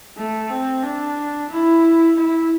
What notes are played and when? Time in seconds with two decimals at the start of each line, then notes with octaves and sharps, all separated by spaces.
0.17 A3
0.50 C4
0.83 D4
1.50 E4
2.16 E4